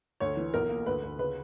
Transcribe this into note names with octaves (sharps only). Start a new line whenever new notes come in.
D2 C#5
E3
B1 A#4
A#3
D2 B4
D2
C#3 B4